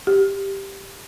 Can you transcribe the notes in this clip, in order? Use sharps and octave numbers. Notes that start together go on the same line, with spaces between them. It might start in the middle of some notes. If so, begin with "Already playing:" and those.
G4